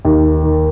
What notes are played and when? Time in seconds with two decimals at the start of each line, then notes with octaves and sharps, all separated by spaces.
0.05 D#2
0.43 D#3